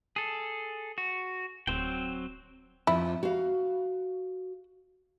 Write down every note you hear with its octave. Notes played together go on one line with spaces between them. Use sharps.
G#4 A4
F#4
D1 F#3 C4 G5
F2 F3 E4
F#4 F5